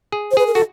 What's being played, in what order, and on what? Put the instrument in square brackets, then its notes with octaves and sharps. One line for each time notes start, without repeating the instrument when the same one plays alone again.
[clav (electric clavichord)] G#4
[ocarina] C5
[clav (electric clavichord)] G#4 [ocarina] B4
[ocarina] A#4
[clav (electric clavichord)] F#4 [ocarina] A4